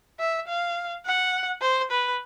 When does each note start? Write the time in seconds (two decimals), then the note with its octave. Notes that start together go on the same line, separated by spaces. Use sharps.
0.19 E5
0.48 F5
1.05 F#5
1.61 C5
1.91 B4